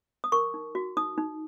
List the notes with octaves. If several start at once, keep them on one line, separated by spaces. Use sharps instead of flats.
D#6
A#4 C#6
D#4
F#4
D#4 D#6
D#4